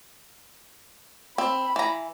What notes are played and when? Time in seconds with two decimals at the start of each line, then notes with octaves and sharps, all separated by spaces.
1.38 C4 B5
1.76 E3 A#5